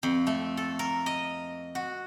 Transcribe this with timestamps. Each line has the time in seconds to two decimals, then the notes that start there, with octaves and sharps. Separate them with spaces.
0.03 F2
0.27 A3
0.57 A4
0.79 A#4
1.06 D#5
1.75 F#4